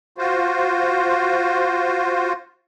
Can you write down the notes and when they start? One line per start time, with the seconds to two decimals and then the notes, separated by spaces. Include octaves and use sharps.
0.18 F4 F#4 C5